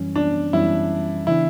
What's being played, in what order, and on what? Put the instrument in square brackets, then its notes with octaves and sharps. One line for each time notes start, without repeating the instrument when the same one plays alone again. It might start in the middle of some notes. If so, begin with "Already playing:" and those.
Already playing: [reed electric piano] F#2 E3 G3 C#4
[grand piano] D4
[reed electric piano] F#2 E3 G3 C#4 [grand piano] E4
[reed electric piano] C#3 E3 B3 D4 [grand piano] E4